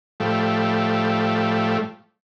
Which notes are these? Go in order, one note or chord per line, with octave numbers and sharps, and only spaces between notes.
A2 F3 G3 A3